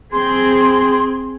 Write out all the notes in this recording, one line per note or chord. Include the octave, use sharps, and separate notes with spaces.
C4 G#4 C6